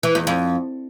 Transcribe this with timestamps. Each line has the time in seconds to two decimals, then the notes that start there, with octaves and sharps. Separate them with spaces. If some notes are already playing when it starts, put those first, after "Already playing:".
0.03 E3
0.15 E2
0.27 F2